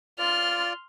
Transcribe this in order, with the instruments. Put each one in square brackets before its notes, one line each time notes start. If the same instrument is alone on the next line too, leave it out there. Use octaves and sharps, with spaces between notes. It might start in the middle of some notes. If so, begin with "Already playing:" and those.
[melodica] F4 D5 [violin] C6 F6